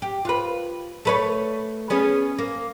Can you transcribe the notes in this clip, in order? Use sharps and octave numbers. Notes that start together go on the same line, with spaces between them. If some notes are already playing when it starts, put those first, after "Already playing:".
G4
F4 B4
A3 B4 C#5
B3 C#4 G#4
A#3